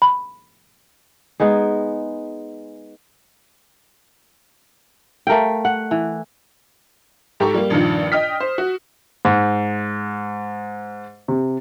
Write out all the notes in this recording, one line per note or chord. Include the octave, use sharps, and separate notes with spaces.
B5
G#3 B3 D#4 G#4
A3 A#4 F5 G5
F#5
E3
G#2 G4 A4 A#5 C#6
G3 A#3
A#1 G2 D#3 F3
D#5 G5 D#6 F6 B6
C5
F#4
G#2
C3